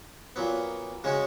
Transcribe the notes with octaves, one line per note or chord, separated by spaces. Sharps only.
A#2 F#3 B3
C#3 G#3 C#4 F#4